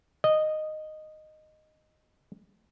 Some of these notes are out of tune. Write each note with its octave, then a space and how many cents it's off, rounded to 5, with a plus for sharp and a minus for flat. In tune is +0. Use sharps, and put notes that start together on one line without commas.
D#5 -10